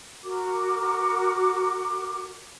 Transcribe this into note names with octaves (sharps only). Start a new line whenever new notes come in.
F#4 A#4 D6